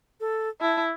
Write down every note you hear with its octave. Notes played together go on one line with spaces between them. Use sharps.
A4
E4 A5